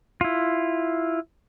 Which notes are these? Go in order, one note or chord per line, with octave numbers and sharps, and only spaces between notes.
E4 F4